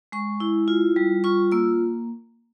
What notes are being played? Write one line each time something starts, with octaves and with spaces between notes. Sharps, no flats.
G#3 C#6
E4
F4
G3
F4 C#6
A#3 E6